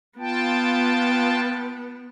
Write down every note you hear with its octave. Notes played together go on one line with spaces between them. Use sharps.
B3 F4 G5 A5